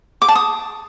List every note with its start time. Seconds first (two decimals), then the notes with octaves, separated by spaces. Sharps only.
0.22 D6
0.28 A5
0.35 D#6